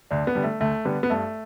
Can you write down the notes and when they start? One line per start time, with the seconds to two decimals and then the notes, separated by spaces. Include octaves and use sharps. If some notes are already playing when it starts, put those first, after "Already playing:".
0.11 D2 D4
0.27 B3
0.35 D3 G3
0.44 A3
0.60 D2 A3
0.85 D3 G3 B3
1.03 B3
1.10 G2 A3